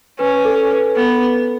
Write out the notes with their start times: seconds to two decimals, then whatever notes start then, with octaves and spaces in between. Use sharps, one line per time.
0.19 C#4 B4
0.45 A4
0.71 B4
0.96 B3 A4